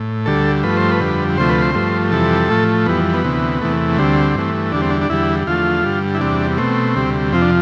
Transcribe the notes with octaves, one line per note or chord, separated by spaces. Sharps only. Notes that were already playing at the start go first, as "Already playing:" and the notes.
Already playing: A2
D2 D3 G3 A4
G2 F3 A3 B4
C5
B4
F2 D3 G3
D2 C3 F3 A3 C5
B4
C5
G2 F3 A3
F2 C3 E3 G3 A4
A2 F3 A3
F2 E3 G3 B3
B3
D2 C3 E3
E2 C3 E3 A3
D2 D3 G3 C4
G2 E3 A3
E2 D3 G3 D4
C4
D4
D4
E2 D3 G3 E4
E2 D3 F3 A3 F4
G2 D3 G3
E4
E2 C3 G3 D4
B2 A3 C4
D2 C3 G3
F2 C3 F3 C4
D4